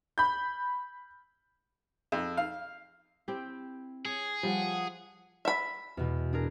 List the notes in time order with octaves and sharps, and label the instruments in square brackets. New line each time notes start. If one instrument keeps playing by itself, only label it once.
[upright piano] B5 G6
[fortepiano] F2
F5
[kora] C4 E4 G4
[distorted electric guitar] G#4 [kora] C#5
[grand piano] F3 [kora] G3 [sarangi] F#5
[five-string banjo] E5 B5
[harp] E2 B2
D4 G#4 A#4